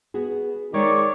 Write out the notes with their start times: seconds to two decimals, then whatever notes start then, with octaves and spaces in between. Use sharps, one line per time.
0.14 B3 F#4 G#4
0.74 D#3 G#3 D#4 C#5 D5